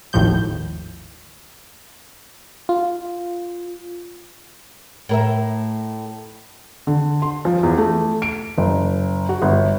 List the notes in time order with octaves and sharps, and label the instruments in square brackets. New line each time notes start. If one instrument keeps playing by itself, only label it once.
[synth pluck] G#1 D#2 A2 F3 G6
[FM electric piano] F4
[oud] A2 A#4 E5
[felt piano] D3
C6
F3
E2
A3
D7
F#1
F#4
G1